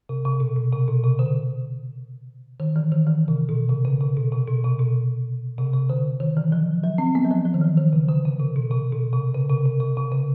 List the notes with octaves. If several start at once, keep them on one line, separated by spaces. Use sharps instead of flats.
C3
C3
B2
B2
C3
B2
C3
D3
D#3
E3
D#3
E3
C3
B2
C3
C#3
C3
B2
C3
B2
C3
B2
C3
C3
D3
D#3
E3
F3
F#3
C4
B3
F#3
F3
F3
D#3
E3
D#3
C#3
D3
C#3
C3
B2
C3
B2
C3
C#3
C3
C3
C3
C3
C#3